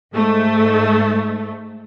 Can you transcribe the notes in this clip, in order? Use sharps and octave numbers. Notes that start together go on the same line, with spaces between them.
G#2 A3